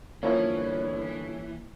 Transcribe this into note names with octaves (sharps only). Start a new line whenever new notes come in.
G1 E3 F3 A#3 C#4 E4